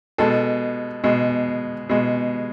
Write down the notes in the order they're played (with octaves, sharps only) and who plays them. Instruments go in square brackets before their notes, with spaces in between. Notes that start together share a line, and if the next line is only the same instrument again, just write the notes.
[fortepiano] B2 G#3 A4
B2 G#3
B2 G#3